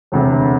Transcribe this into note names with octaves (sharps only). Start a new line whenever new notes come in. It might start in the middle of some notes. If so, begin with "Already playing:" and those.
E1 D2 C3